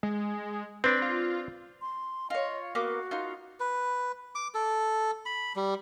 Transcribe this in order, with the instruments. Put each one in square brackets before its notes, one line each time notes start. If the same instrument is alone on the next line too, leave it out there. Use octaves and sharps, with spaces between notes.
[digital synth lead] G#3
[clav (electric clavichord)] C4 D4 [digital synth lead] B4
[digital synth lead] F4
[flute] C6
[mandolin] F4 C#5 [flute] D#5
[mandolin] A#3 B3 D6 [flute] F#4
[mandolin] D#4 F4
[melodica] B4
D6
A4
B5
G3